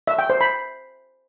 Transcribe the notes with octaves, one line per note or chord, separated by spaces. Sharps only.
E5
G5
C5
B5